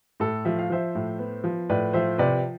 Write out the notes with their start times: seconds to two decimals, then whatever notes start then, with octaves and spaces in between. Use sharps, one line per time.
0.20 A2 A4
0.45 F3 E5
0.59 F5
0.70 F3 C5 E5
0.95 A2
1.19 B3
1.44 F3
1.70 A2 B4 D5
1.93 F3 C5 E5
2.18 C3 B4 D5